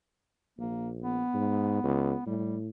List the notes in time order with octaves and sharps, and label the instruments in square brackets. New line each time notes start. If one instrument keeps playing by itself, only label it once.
[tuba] A#1 [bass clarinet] A#3
[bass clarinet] B3
[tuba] G#2
C#2
[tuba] A2 [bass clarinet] G3